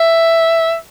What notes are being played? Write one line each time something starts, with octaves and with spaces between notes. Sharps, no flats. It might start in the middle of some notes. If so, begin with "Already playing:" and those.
Already playing: E5